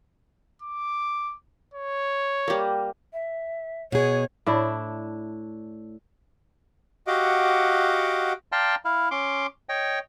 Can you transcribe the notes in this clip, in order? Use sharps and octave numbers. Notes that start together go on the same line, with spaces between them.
D6
C#5
G3 A#3
E5
B2 G#4 C#5
A2 D4 E4
F#4 G4 D#5 F5 F#5 D6
D5 F5 G5 A5 A#5 C6
E4 F5
C#4 C6 D6
C#5 D#5 G5